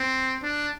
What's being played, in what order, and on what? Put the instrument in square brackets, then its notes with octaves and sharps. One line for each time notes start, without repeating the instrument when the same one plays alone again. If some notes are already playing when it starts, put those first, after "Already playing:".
Already playing: [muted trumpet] C4
D4